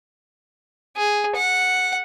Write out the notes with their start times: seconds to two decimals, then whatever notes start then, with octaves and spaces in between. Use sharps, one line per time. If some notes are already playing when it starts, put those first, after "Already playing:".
0.97 G#4
1.36 F#5